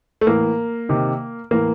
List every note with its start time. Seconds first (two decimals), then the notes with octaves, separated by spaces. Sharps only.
0.21 A3
0.27 A2 E3 A#3
0.89 C3 D#3
1.51 A2 E3 A#3